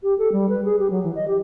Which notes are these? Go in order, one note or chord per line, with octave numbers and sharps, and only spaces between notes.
G4
A4
G3
B4
G#4
G4
F#3
E3
D#5
G4